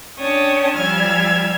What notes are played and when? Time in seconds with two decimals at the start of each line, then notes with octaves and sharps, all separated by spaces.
0.19 C#4 D4 C#5 G5 A5 D#6
0.77 F3 G3 G#5 E6 F6 G#6